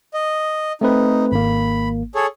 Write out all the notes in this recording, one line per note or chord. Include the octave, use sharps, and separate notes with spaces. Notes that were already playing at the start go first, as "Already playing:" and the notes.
D#5
A3 C4 D#4 B4
G#1 A#3 B5
G#4 A4 C#5